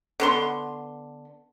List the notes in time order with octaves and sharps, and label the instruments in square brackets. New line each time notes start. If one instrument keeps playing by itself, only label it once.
[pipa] D3 B3 C6